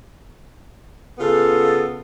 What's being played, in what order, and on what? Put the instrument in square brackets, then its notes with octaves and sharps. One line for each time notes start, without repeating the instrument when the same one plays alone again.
[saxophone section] C#3 B3 F4 [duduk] A4